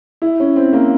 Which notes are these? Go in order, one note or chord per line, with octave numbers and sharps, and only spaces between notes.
E4
C#4
C4
A#3